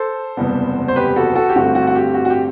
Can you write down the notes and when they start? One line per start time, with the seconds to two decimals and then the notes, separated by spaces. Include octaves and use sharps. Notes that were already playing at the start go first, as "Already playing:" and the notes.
Already playing: A4 C5
0.37 F#1 E2 C3 G3 B3
0.88 C5
0.96 G4 B4
1.16 F#4 A4
1.35 F#4 A4
1.49 G4
1.55 G2 D3 A3 C4 F#4
1.75 F#4
1.87 F#4
1.95 G4
2.14 F#4
2.25 F#4
2.30 G4